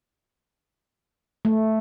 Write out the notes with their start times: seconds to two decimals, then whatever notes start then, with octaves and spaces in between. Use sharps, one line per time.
1.45 A3